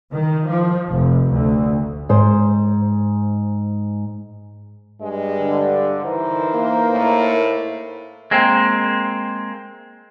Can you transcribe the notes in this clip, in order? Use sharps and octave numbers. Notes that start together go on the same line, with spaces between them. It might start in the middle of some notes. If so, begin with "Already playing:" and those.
D#3
F3
F1
D2
G#2 C5
G2 G#3
D3
E3 D#4 A#4 C5
A#3
A2
G#3 A#3 C4